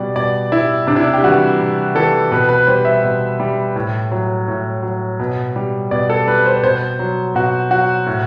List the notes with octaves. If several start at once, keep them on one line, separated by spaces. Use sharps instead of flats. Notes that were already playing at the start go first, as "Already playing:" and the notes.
Already playing: B2 G3 D5
B2 D5
G3 E4
C3 D4
E4
D4
G4
E3 G3 F#4
C3
E3 G3 A4
B2 B4
B4
G3 C5
E5
B2
G3
A2
F#3
A2
F#3
B2
G3
B2 D5
A4
G3 B4
C5
B2 C5
F#3
B2 F#4
F#3 F#4
A2